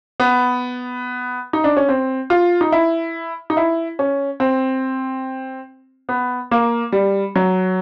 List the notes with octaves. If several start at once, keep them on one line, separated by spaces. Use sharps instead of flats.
B3
D#4
D4
C#4
C4
F4
D#4
E4
D#4
E4
C#4
C4
B3
A#3
G3
F#3